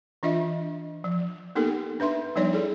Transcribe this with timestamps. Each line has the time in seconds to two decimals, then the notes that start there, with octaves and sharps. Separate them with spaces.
0.23 E3 D4 F4 D#5 E5
1.04 F3
1.55 A#3 B3 D#4 G4 A4 A#4
2.00 D4 B4 E5 C6
2.36 F3 G3 B3 D#4 C#5 D5
2.53 E4 G#4 A4